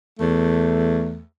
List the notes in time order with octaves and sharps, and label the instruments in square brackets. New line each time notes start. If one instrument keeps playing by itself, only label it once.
[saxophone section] E2 A3